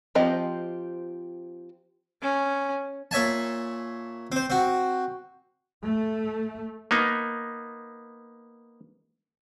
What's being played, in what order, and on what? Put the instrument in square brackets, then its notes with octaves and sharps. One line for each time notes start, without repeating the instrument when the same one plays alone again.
[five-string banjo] F3 C4 G4 D#5
[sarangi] C#4
[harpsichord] A#2 C#5 E5 G#5 A5
C4 C5
C4 F#4
[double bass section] A3
[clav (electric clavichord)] A#3 B3 D#4